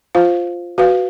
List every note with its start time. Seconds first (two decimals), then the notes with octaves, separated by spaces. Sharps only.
0.15 F4 C5 F5
0.78 F#4 B4 F5